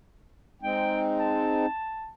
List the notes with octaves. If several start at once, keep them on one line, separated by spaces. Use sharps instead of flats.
G#3 C4 D#4 G5
A5